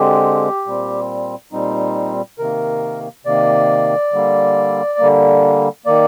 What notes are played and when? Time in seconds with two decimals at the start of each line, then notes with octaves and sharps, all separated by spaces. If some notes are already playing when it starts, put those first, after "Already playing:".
Already playing: D3 G#3 C4 G4
0.66 A#2 G3 C4
1.52 A#2 G3 C4 D#4
2.39 C3 D#3 A#3 A#4
3.25 C3 D#3 A#3 D5
4.13 D3 G3 A#3
4.99 D3 G3 A#3
5.86 D#3 A#3 D5